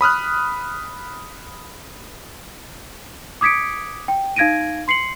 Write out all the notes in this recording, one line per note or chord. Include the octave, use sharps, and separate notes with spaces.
B5 D#6 F6 F#6
D6 D#6 G#6 B6 C#7 D7
G5
D#4 F5 G#6 A#6 D7 D#7
C6 C7 C#7 F#7